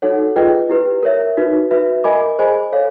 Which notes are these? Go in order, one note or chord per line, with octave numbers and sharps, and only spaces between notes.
D#4 F#4 A4 C#5 F#5
F4 G#4 B4 D#5 G5
E4 G4 B4
A#4 C#5 E5
D#4 F#4 B4
F#4 B4 E5
A#4 D#5 G#5 B5 D6
G#4 C5 D#5 G#5 B5
A4 C#5 F5